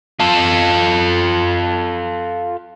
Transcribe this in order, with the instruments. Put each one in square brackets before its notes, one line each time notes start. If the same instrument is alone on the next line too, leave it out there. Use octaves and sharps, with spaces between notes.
[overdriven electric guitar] F4 A4